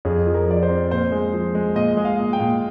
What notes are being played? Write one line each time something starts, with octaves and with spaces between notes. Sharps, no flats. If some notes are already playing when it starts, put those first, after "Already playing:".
F2 G#4
F3
A#4
F3 D5
C5
C4
A#2 C5
G#3
F3
G#3
A#2 D#5
G#3
F5
A#2
G5
A#2